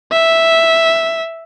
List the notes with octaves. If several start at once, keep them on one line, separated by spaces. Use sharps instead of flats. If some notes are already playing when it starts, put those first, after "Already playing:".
E5